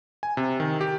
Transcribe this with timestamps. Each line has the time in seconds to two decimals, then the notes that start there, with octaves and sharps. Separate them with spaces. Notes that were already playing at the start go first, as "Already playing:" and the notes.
0.23 G#5
0.37 C3
0.60 D#3
0.81 G4